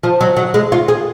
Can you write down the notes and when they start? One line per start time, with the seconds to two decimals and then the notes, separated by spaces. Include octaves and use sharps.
0.03 F3
0.21 F#3
0.37 F#3
0.54 G#3
0.72 F4
0.88 G#4